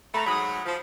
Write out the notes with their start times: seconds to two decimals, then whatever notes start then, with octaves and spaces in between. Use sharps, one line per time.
0.14 A3 A#5 B5
0.26 G#2 F#3 G#4 B5 D#6
0.66 F3